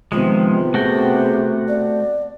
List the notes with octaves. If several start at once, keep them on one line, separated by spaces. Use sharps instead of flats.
C3 D#3 F3 G#3 B3 F4
A3 F#4 G#4 G5
D5